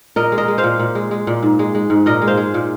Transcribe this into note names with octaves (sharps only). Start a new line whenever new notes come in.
A#2 A#4 D#5
G#3
A#4 D#5
G#3
C5 F5
A#2
A#2
G#3
G#3
A#2
G#2
G#3
G#3
G#2
A#2 A#4 D#5
G#3
C5 F5
G#3
A#2